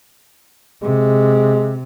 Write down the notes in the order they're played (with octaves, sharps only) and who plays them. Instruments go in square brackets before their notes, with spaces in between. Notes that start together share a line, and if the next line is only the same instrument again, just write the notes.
[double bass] C3 [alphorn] G#3